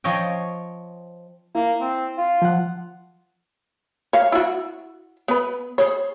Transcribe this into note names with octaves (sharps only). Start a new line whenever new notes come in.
F3 C#5 D#5 G5
A#3 E4
C4
F4
F3 F#5
C#5 F5
E4 F#4
B3 B4
G#4 C5 C#5